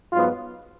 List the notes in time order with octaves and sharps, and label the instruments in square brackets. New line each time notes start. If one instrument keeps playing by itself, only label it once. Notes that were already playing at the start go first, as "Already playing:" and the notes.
[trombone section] G#2 F#3 B3 F4